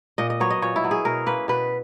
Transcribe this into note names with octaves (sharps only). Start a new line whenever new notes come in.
A#2 D#5
D#5
F#3 B3 C#5
D#5
A#2 C#5
E4
F#3 B3
G#4
B2 A#4
A#3 C#4 B4
B2 B4